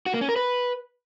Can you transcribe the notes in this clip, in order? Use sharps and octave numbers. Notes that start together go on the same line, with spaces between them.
F#4
A#3
C#4
A#4
B4